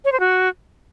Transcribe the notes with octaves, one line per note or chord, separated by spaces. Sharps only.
C#5
C5
F#4